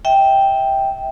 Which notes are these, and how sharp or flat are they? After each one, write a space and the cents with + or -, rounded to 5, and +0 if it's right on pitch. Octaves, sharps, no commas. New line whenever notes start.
E5 -25 G5 +0